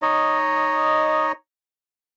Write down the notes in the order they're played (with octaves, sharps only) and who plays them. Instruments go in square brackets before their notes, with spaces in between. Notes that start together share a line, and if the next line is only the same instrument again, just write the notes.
[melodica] D#4 C#5 D#5